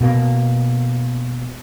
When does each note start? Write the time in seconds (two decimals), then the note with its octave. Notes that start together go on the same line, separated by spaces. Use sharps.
0.01 B2 A#3